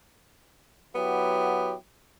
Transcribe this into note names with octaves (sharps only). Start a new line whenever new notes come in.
F#3 B3 E4 G4